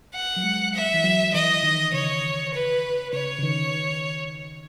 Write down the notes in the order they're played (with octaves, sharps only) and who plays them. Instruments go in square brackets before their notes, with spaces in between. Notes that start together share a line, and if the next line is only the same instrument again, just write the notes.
[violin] F#5
[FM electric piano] F#3
G#3
[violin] E5
[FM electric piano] E3
F#3
[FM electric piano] E3 [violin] D#5
[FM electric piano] D#3
[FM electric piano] C#3 [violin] C#5
[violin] B4
[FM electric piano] C#3 [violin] C#5
[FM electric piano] C#3
D#3